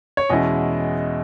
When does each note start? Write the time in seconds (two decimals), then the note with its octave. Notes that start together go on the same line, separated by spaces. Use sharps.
0.17 C#5
0.29 E2 B2 G#3 C#4 E4 D#5